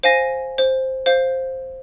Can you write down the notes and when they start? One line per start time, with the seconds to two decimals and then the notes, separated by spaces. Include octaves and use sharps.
0.03 C5 F5 G#5 A#6 D#7
0.58 C5
1.06 C5 F5 G6